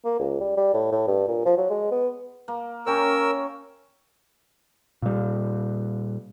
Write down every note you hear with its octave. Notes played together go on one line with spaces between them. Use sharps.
A#3
C#2
G3
G3
A2
A2
G2
A#2
F3
F#3
G#3
B3
A#3
C#4 G4 A#4 C#5 E6
A#2 G3